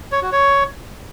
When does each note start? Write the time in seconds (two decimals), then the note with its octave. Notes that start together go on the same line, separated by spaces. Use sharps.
0.12 C#5
0.22 F#4
0.32 C#5